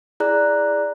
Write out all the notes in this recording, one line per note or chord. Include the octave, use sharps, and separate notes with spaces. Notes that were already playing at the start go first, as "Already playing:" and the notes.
E4 G#4 D5 A#5 F#6